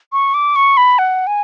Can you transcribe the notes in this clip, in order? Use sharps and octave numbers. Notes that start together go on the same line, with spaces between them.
C#6
D6
C#6
B5
F#5
G#5